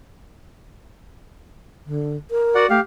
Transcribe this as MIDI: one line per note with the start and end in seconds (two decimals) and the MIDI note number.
1.86 2.16 50
2.31 2.66 70
2.55 2.67 66
2.55 2.67 74
2.55 2.67 78
2.70 2.79 57
2.70 2.80 67
2.70 2.80 77